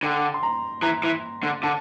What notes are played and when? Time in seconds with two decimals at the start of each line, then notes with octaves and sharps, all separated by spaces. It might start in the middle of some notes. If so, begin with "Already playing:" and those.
0.03 D3 G5
0.34 C6
0.43 A#5
0.82 E3 A#5
1.04 E3
1.43 D3
1.63 D3 A5